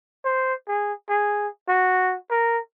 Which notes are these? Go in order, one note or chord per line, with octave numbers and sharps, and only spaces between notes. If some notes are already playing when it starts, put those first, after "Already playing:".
C5
G#4
G#4
F#4
A#4